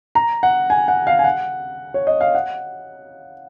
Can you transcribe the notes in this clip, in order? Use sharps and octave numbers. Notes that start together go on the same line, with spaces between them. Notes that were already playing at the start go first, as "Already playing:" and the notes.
A#5
F#5
G#5
F#5
F5
G#5
F#5
C#5
D#5
F5
F#5